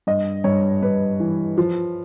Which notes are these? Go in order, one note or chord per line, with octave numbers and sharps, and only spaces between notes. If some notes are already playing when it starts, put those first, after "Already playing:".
G2 D#5
G2 C#5
G2 B4
E3
F3